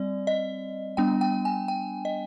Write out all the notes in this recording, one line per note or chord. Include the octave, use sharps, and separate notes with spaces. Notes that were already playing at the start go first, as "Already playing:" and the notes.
Already playing: G3 C4 D5
D#5
G3 B3 D4 G5
G5
G#5
G5
D#5